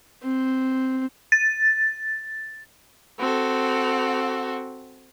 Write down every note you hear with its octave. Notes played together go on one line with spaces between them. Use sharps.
C4
A6
C4 F#4 A4